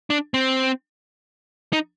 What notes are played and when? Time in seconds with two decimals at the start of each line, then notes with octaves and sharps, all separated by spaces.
0.10 D4
0.34 C4
1.73 D#4